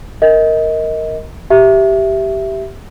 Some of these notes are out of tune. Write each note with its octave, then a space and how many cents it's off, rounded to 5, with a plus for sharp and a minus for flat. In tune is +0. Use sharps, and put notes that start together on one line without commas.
A#4 -5 D#5 +25
G4 -10 E5 +5